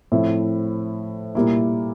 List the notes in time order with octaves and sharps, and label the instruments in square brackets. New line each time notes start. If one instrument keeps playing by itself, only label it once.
[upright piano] A2 F3 C4 E4
A#2 G3 A#3 E4